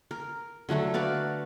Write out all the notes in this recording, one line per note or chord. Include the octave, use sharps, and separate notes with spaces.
A#4
D3 F#3 A3 A4
F#4 B4 D5 F5